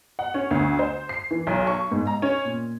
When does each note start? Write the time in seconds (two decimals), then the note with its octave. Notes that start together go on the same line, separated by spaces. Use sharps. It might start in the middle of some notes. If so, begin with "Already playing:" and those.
0.19 F#5
0.34 C#4
0.51 D2
0.79 C5
1.09 C7
1.31 E3
1.47 B1
1.67 C#6
1.91 G#2
2.07 A#5
2.22 C#4
2.45 A#2